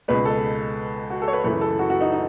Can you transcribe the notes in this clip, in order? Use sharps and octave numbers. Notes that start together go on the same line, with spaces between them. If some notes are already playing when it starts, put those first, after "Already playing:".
C#2 B2 G#3 B4
A4
F#4
A4
C#5
B4
F#2 C#3 E3 A3 B4
A4
F#4
F#4
D#4
D#4